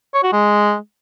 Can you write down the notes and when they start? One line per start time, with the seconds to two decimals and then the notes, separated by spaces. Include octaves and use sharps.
0.14 C#5
0.23 F#4
0.32 G#3